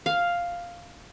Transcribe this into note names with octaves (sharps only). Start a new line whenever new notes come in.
F5